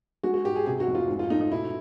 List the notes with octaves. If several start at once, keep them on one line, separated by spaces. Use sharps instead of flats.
G#3 F#4
F#4
G#2 G4
G#4
C3 G#4
F#4
F1
F4
G#2
F4
A3 D#4
D#4
B2 E4